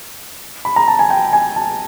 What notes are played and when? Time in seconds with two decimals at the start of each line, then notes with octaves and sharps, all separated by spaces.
0.65 B5
0.76 A#5
0.88 A5
0.99 G#5
1.10 G5
1.33 G#5
1.56 A5